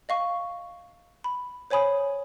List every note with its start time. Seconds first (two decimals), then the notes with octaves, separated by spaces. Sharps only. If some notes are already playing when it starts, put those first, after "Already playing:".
0.09 D#5 F5 C#6
1.24 B5
1.70 C5 C#5 G#5 B5 D#6